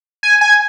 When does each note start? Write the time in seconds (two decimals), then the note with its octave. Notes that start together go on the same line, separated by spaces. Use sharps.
0.23 G#5
0.41 G#5